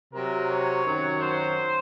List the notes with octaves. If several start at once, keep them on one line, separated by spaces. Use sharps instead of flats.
C3 F#3 A#4
C#5
F#2 D#3 F#3
C5